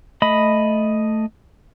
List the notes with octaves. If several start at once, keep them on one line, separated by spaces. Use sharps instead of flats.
A3 D#5 B5